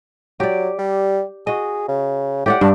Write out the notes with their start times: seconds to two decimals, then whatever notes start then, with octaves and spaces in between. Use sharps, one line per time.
0.40 F#3 G4 D5
0.79 G3
1.47 F#4 G#4 D#5
1.88 C#3
2.46 A2 G4 D5 F#5
2.61 G2 D4